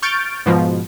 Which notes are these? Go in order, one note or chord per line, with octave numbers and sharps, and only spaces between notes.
C#6 F6 G6 A6 D7
G#2 B2 F3